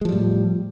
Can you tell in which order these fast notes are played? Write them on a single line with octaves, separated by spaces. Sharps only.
G#3 F3 G3 A2